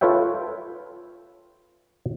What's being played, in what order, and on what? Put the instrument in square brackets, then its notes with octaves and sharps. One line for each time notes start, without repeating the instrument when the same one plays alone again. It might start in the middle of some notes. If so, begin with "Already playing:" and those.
[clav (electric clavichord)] F4 A4 B4 C#5 E5 G5